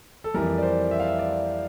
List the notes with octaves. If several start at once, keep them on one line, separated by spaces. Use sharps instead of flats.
A4
F2 E3 G3 A#4
D5
C5
E5
F5
E5
D5